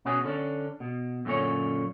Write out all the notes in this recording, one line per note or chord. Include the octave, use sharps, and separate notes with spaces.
B2 C#4 F#4 G#4
D3 C#4 D4
B2
F#2 A#2 D3 A#3 C#4 C#5